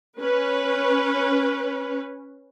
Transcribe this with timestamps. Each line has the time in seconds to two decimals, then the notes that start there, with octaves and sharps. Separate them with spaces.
0.20 C#4 B4